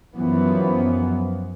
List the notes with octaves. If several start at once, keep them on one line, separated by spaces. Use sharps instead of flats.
F#2 E3 F3 B3